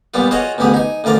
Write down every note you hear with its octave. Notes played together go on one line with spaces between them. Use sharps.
A#2 G3 B3 F4
F4 F#4 G#4 C#5 D#5 F5
A1 D2 B3 G4 G#4
D#4 G#5
A1 D2 F4 A#4 D5